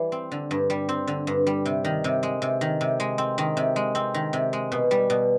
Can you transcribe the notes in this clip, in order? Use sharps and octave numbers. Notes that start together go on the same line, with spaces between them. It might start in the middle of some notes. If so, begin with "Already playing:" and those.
Already playing: E3 G3
C4
D3
G2
G3
C4
D3
G2
G3
C3
D#3
C3
G#3
C3
D#3
C3
G#3
C4
D#3
C3
G#3
C4
D#3
C3
G#3
B2
G3
B2